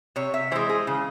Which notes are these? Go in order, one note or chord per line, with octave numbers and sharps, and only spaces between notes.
C3 C#5
E5
E3 G#3 C5
G#4
C#3